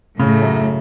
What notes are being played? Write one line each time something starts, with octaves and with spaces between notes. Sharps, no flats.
A2 C#3
F#2